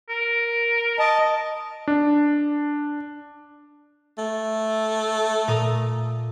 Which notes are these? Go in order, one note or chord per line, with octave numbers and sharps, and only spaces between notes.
A#4
D#5 A5
D4
A3
A#2 A#5 D#6